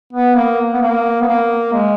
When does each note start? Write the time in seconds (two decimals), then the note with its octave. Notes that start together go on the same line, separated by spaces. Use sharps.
0.13 B3
0.35 A#3
0.74 B3
0.82 A#3
1.21 B3
1.28 A#3
1.73 G#3